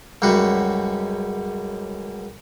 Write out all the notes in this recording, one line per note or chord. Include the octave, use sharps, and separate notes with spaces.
C#2 F#2 G3 F#4